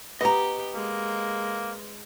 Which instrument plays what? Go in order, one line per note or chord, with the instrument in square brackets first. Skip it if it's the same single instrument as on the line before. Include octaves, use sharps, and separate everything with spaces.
[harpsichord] B3 [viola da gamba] G4 [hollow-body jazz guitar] D#5 A#5
[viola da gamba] G#3 [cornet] A#3